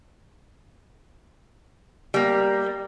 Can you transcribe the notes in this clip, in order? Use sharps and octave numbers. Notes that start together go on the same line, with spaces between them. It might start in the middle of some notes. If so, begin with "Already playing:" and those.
G3 A#3